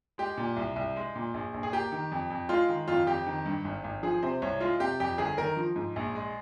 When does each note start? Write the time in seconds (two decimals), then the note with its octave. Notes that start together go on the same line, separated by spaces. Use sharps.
0.18 G#3 G4
0.37 A#2
0.57 C2
0.76 C2
0.96 G#3
1.15 A#2
1.34 A#1
1.54 A#1
1.63 G#4
1.73 A#3 G4
1.92 D#3
2.12 F2
2.30 F2
2.49 G#3 F4
2.69 D#3
2.88 F2 F4
3.07 F2 G4
3.27 D#3
3.46 G2
3.65 G#1
3.84 G#1
4.03 F3 G#4
4.23 C3 C5
4.42 C2 C#5
4.60 G#3 F4
4.80 C3 G4
5.00 F2 G4
5.18 G1 G#4
5.37 D#3 A#4
5.57 F3
5.76 G#2
5.96 A#1
6.15 G#3